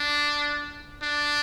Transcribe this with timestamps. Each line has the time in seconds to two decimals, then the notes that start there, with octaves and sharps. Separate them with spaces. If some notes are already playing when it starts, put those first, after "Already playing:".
Already playing: D4
1.03 D4